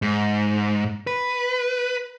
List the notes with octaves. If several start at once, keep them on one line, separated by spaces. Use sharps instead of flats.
G#2
B4